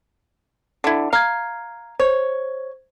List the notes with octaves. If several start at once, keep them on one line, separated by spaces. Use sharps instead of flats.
D3 E4
F5 A#5 G#6
C5 C#5